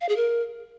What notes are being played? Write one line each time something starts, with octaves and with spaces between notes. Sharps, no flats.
F5
G#4
A#4